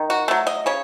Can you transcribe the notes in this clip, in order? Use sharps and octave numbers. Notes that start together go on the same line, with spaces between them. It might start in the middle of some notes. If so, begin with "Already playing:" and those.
Already playing: D#3
F#4
F#3 A3
D#5
C#3 C#5